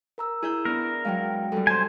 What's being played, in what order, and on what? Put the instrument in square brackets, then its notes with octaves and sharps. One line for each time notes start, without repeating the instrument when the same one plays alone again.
[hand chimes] A#4 A#5 E6
[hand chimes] E4 [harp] G#4 E5 G6
[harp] B3 D4 [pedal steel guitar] A#4
[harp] F#3 G#3 [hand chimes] F5 G5
[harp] F#2 G3 [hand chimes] A4
[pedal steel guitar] C5 G#5 [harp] A5 C6